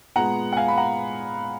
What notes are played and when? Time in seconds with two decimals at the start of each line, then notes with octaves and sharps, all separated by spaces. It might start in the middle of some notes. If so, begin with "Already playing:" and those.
0.16 A#2 G#3 B3 F#5 A#5
0.53 F#5
0.56 F5 G#5
0.68 B5
0.77 F#5 A#5